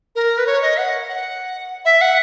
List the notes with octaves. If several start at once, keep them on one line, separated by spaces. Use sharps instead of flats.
A#4
B4
C#5
D#5
F#5
F#5
E5
F#5